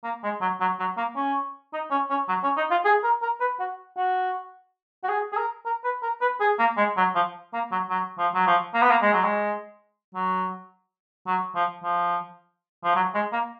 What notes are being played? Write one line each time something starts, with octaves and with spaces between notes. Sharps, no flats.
A#3
G#3
F#3
F#3
F#3
A#3
C#4
D#4
C#4
C#4
F#3
C#4
D#4
F4
G#4
A#4
A#4
B4
F#4
F#4
F#4
G#4
G#4
A#4
A#4
B4
A#4
B4
G#4
A#3
G#3
F#3
F3
A#3
F#3
F#3
F3
F#3
F3
A#3
B3
A#3
G#3
F#3
G#3
F#3
F#3
F3
F3
F3
F#3
G#3
A#3